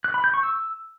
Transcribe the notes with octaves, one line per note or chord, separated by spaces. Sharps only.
F#6
B5
G6
C#6
E6